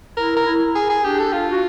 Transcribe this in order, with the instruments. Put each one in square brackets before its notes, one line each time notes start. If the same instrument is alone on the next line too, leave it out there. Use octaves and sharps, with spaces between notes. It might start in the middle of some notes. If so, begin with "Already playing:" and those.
[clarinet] E4 [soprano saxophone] A#4
[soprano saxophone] A#4
[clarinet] E4
[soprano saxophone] G#4
G#4
[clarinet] D4 [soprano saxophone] G4
[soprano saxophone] A4
F4
[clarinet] F#4